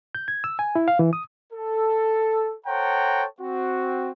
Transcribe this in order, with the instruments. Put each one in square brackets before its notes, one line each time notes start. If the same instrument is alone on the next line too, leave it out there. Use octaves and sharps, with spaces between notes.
[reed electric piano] G6
G#6
E6
G#5
E4
F5
E3
D#6
[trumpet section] A4
A4 C5 C#5 F#5 G5 A#5
C4 F#4